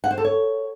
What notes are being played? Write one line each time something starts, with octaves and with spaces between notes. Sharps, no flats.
F#5
C5
A4
C#5